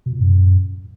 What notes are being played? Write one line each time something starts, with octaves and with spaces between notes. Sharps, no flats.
B2
A#2
F#2